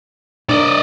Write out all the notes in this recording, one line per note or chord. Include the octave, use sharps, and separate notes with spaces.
D4 A#4 D5 D#5